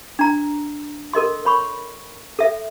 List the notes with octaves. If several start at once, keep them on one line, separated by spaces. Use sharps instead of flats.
D4 A#5
A4 A#4 D#5 C6
C#5 B5 C#6
A4 E5